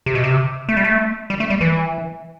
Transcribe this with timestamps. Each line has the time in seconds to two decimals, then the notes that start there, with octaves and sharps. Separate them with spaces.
0.06 C3
0.15 B2
0.24 C3
0.69 A3
0.77 G3
0.84 A3
1.30 G3
1.40 A3
1.50 G3
1.61 E3